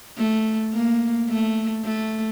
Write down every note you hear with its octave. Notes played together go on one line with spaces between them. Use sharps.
A3
A#3
A3
A3